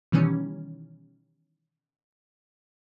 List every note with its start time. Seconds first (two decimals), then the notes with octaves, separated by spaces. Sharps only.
0.12 B2 D#3 E3 G3 C#4